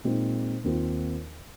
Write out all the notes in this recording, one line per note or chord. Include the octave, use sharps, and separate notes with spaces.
A#2 G#3 C4 D#4
D#2 D#3 C4 F4